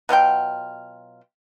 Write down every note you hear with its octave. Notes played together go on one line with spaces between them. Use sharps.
B2 F#3 F4 G5